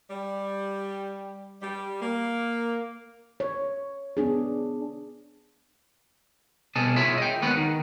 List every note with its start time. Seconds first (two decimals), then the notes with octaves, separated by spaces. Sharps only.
0.10 G3
1.62 G3
2.01 A#3
3.40 C#5
4.17 B3 D4 G#4
6.76 C2 B2 G#4 D#5 A5
6.96 E4 F4 G#4 C#5 E5
7.18 D#5 G5
7.42 D#2 G#3 B3 F#4 B4
7.57 D#3